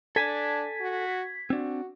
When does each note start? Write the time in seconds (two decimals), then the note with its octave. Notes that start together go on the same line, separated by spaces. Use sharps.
0.16 D4 A4 G#5 A5 G#6 B6
0.81 F#4
1.50 C4 D4 F#4